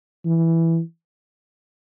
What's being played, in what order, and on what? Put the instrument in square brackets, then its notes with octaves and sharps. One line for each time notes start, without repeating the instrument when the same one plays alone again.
[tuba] E3